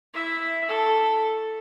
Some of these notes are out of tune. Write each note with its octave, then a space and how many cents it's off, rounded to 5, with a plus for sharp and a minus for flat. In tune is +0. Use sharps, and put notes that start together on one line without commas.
E4 +0 E5 +0
A4 +0 C#6 +0